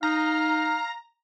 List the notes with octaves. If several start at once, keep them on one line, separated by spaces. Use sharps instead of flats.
D#4 F5 A#5